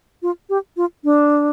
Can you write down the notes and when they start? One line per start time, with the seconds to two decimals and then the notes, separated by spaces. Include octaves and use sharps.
0.22 F4
0.49 G4
0.77 F4
1.04 D4